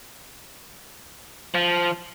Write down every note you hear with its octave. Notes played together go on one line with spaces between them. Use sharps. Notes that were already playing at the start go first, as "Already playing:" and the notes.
F3